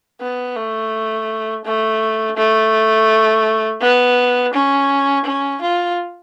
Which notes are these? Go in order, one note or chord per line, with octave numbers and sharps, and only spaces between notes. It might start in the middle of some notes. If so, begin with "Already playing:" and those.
B3
A3
A3
A3
B3
C#4
C#4
F4